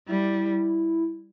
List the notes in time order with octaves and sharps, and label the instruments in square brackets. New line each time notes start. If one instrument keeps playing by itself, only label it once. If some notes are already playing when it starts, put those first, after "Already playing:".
[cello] G3 [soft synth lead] E4